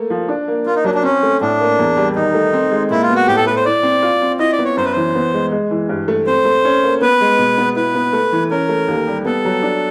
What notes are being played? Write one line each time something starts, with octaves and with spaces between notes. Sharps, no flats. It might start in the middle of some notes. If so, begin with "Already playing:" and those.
Already playing: A3 A#3
F3
D4
A#3
A#3 F4
D#4
F#3 D4
D4
C4 C#4
A3
A2 D4
A#3
E2
G3
D#3 D#4
A3
C4
G#3
A#2 E4
F4
B3
F#4
A2 G4
A4
A3 B4
C5
E4 D5
C4
F4
C4
E4 D#5
D5
B3
C#5
F#2 C5
B4
E3 C5
B3
G#3
G#3
E3
G2
A3
C4 C5
A3
C#4
A#3
B3 B4
G#3
B2
B3
E4 B4
B3
A3
E3
C#4 A#4
A3
D#2
G3
B3 A4
F#3
D4